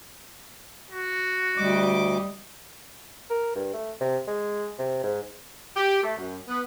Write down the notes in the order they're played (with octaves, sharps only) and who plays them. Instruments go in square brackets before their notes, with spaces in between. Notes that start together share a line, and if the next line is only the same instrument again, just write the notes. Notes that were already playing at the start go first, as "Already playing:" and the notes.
[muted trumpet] F#4
[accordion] D2 D6 [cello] G3 D#5
[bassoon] A#4
G2
A3
C3
G#3
C3
G#2
[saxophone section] G4
A3
F#2
B3